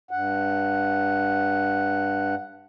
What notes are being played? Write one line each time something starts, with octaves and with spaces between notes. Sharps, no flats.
G2 F#5